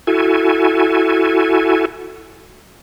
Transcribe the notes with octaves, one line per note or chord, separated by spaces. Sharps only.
E4 F#4 A4 G#5